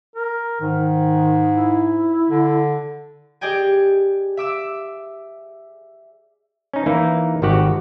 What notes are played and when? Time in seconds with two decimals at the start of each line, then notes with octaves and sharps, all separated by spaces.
0.16 A#4
0.61 G#2 D#3
1.52 E4
2.30 D3
3.41 G4 G#4 D5 D#5 G5 G#5
4.37 E5 D6 E6
6.73 C#4 D#4
6.86 E3 A#3 D#4 E4
7.42 G#1 D#3 F#4 G4 F#5